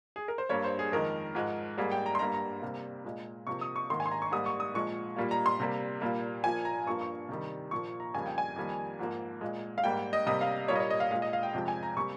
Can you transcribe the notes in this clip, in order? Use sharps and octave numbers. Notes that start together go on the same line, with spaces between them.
G#4
A#4
C5
G2 G3 A#3 C#5
C5
G#4
F2 D#3 G#3 A#4
G#2 F3 G#3
G#2 G3 A#3 G#4
G5
A#5
C6
G2 G3 A#3 A#5
A#5
C3 G3 A#3
A#2 G#3
C3 F3 A#3 C#6
D#6
C#6
G#2 D#3 A#3 C6
G#5
C6
A#5
C#6
G#2 G3 A#3 D#6
C#6
D#6
A#2 F3 G#3 C#6
A#2 G3 A#3
A#5
C6
C3 G3 A#3
A#2 G3 A#3
A#2 F3 A#3 G#5
A#5
G2 F3 A#3 C#6
C#6
C3 D#3 G3
A#2 F3 A#3 C#6
A#5
F2 C#3 G3 A#3 G#5
G5
G#5
F2 D#3 G3 A#3
G#2 F3 A#3
A#2 G#3
F5
G#2 G3 A#3 G5
D#5
C3 G3 A#3 D#5
F5
A#2 G3 A#3 C#5
D#5
C#5
D#5
F5
A#2 G#3 F5
D#5
F5
G5
F2 C3 F3 G#3 G5
G#5
A#5
C3 G3 A#3 C#6